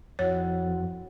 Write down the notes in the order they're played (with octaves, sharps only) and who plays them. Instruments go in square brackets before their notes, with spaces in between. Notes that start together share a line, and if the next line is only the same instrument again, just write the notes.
[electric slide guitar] F2 [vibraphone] E4 F#4 F#5 [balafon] C#5